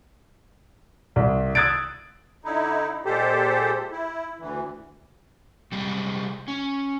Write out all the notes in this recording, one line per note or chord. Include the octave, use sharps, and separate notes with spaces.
C2
D#6 E6 F#6 G#6 A6 D7
D3 D#4 E4
A#2 G#3 G4 A4 C5
E4
D2 E3
C3 G3 G#3 G4
C#4